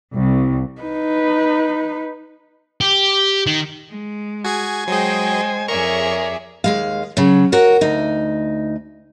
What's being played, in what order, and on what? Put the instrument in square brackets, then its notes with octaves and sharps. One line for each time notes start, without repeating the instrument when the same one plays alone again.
[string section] C2
[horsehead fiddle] D#4 B4
[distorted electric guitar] G4
D#3
[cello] G#3
[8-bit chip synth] F#4 G#4 G#6 [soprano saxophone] G#5
[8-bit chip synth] F#3 G#4 [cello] G#3 C5 [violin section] D#5 G5
[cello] F2 C#5 [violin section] G#4 D5 E5 [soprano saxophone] A#4 [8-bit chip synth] C#6
[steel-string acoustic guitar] D#2 G#3 F5
C#3 F#3
F#4 A#4 C#5
D2 D#4